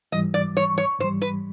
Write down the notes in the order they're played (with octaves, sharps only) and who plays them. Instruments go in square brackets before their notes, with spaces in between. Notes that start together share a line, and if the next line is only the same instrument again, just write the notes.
[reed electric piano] G#2 E3 G3 [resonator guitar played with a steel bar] D#5
[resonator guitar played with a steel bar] D5
C#5
C#5
[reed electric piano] G#2 E3 G3 [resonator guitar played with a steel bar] C5
[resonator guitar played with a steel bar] B4